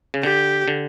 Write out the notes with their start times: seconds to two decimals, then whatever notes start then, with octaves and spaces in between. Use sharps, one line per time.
0.14 C#3
0.23 D3 G4
0.68 D3